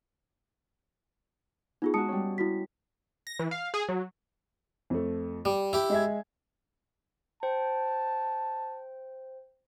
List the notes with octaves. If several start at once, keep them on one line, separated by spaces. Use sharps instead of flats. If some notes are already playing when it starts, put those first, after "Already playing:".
B3 D#4 F4 G#4
G#3 D#4 F#4 A5 D#6 C#7
G3 C#4
E4 F#4 B6
A#6
E3
F5
G#4
F#3
F2 A3
G3 D6
E4 G4
G#3 E5 G#6
C5 G5 A5